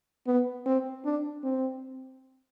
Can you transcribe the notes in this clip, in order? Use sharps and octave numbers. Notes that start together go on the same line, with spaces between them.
B3
C4
D4
C4